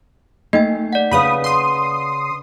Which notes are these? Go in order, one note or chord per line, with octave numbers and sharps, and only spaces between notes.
A3 A#3 D#4 D#5 G5
D5 F#5
C#3 B4 F5 B5 D#6
C6 D#6